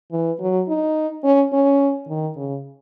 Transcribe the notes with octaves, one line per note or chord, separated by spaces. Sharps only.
E3
F#3
D#4
C#4
C#4
D#3
C#3